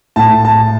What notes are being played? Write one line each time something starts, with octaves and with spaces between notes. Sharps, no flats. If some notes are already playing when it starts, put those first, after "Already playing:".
A2 A5
A5